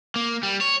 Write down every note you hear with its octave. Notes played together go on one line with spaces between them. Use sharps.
A#3
G3
C#5